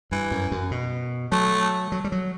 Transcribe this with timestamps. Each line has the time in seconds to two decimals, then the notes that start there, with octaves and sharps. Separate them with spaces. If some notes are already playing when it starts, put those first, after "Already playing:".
0.12 G2 E3
0.31 F#2
0.51 F#2
0.71 B2
1.32 F#3 A3
1.92 F#3
2.04 G3
2.12 F#3